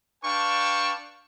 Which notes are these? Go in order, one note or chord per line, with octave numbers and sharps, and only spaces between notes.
D4 B4 F5 G5 A5 C#6